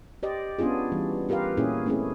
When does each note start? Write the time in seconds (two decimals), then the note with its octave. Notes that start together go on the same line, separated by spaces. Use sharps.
0.23 G4 C5 D5 D#5
0.59 B3 C#4 D4 F4 G#4
0.92 E3 G3
1.29 F4 G4 A#4 B4 F5
1.57 A#2 A#3 C#4 E4 G#4
1.86 A3 C4 C#4 E4 G#4